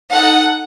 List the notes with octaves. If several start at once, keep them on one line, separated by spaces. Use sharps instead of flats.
D#4 A4 F#5